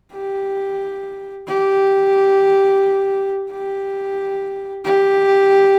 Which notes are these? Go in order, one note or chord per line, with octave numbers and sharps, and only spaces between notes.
G4
G4
G4
G4